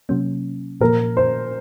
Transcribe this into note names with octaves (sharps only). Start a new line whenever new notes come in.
C3 F#3 A#3 C#4
A#2 F3 A#3 A#4
C5